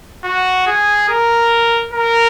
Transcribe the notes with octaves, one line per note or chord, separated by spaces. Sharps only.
F#4
G#4
A#4
A#4